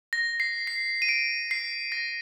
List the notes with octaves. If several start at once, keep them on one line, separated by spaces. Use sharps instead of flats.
A#6
C7
C7
D#7
D7
C7
A#6